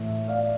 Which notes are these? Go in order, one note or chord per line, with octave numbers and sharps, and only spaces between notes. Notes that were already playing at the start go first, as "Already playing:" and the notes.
Already playing: A2 E3 A3 E5
D5 F5